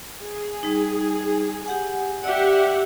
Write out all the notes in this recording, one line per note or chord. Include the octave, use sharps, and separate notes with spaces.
G#4
G3 D#4
G4 F#5 G#5
G4 D5 E5 F#5